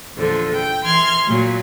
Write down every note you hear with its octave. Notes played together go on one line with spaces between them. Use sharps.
E2 A#2 D3 F3
G5
E3 C6 F6 G#6
A#2 F#3